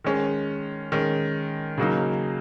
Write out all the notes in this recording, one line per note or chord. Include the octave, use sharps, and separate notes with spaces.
D#3 G#3 C#4
D#3 G#3 C#4
C#3 F#3 A#3 D#4